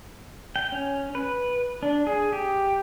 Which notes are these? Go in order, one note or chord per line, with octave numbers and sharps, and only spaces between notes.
G5
C#4
B4
D4
G#4
G4